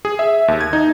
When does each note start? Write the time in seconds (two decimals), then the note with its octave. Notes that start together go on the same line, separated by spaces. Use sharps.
0.05 G#4
0.19 E5
0.48 D#2
0.61 G#6
0.73 D#4